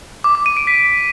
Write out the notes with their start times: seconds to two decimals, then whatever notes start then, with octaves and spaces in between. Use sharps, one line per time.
0.24 D6
0.35 D6
0.46 D#7
0.57 D7
0.67 B6